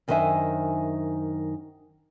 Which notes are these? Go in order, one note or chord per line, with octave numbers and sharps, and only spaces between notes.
F#2 D#3 D4 C5 E5 G#5